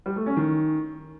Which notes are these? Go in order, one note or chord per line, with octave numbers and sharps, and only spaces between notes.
G3
A3
C#4
D#3